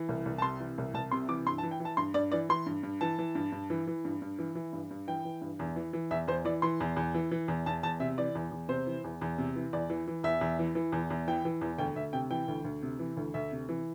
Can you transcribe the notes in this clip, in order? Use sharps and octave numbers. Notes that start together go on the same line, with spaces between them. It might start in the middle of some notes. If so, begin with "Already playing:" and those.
Already playing: E3
C2
C2
A5
C3 C6
E3
C2
C2 A5
C3 C6
E3 D6
G2 C6
A5
E3
G5
E3
A5
G2 C6
G2 D5
E3 D5
E3 C6
G2
G2
E3 A5
E3
G2
G2
E3
E3
G2
G2
E3
E3
G2
G2
E3 G5
E3
G2
E2
E3
E3
E2 E5
E2 C5
E3 D5
E3 C6
E2
E2
E3
E3
E2
E2 A5
E2 A5
C3 E5
E3 D5
E2
E2
C3 C5
E3
E2
E2
C3
E3
E2 D5
E3
E3
E2 E5
E2
E3
E3
E2
E2
E3 G5
E3
E2
D2 G5
D2 E5
C3 G5
E3 G5
D2
D2
C3
E3
D2
D2 E5
C3
E3